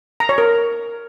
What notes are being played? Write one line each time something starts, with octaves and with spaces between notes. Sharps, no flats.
A#5
C#5
A#4